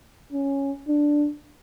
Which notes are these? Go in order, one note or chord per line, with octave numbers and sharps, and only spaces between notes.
C#4
D4